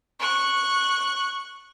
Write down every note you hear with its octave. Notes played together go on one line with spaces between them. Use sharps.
C#6 F#6